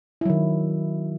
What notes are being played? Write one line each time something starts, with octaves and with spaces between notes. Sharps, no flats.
D#3 F#3 E4